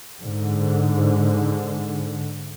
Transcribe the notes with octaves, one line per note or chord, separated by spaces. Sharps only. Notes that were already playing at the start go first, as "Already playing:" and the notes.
G#2 D3